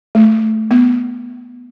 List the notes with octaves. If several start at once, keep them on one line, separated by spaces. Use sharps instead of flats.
A3
B3